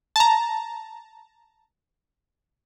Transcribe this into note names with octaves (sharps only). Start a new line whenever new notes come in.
A5 A#5